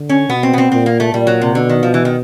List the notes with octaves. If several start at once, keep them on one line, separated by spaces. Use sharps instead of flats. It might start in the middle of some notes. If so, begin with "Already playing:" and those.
Already playing: D3
C#4
B2 B3
C4
B3
C4
A#2 C4
A#3
A3
A#2 G3
F#3
C3
B2 D3
D#3
F3
E3
D#3